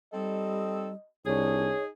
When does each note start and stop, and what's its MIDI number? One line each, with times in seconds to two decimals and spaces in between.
0.13 0.94 55
0.13 0.88 60
0.13 0.88 63
0.13 0.88 69
0.13 1.08 75
1.26 1.71 36
1.26 1.77 62
1.26 1.86 63
1.26 1.86 68
1.26 1.84 73